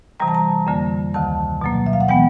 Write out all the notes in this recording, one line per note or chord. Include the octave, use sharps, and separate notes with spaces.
C3 E3 G3 A#5
A5
A#5
F2 D3 G3 A#3
D2 C3 D#3 A5
B2 F#3 A#3
E5
F5
F#5
E3 G#3 B3 G5